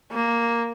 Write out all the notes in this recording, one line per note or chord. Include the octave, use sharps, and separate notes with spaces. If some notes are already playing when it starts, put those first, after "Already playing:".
A#3